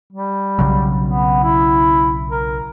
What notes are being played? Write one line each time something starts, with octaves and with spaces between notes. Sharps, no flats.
G3
B1 C#3 F#3
B3
E4
A#4